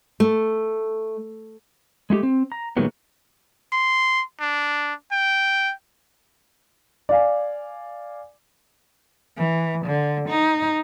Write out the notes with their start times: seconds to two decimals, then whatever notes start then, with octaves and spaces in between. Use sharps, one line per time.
0.20 A3
2.10 G#3 A3 E4 G4
2.23 C4
2.52 A#5
2.77 A#2 D#3 F#3 G#3 A3 B3
3.73 C6
4.40 D4
5.12 G5
7.09 D5 F5 G#5
9.37 E3
9.85 D3
10.29 D#4